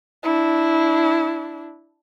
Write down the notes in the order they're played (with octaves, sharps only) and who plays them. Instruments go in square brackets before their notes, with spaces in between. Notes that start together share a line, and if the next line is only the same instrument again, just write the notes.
[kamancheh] D4 E4